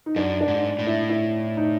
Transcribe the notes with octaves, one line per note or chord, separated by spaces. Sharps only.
D#4
F#2 D4
D4
G#2
A2
E4
E4
D#4